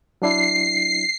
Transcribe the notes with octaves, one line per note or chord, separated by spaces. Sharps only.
F#3 D4 E4 C7